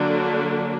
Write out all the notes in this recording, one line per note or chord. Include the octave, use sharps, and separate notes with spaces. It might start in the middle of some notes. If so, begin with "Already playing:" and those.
Already playing: D3 F#3 A#3 D4